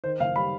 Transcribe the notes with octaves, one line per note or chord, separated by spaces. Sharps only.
D#3 C5
F#1 F5
G3 B5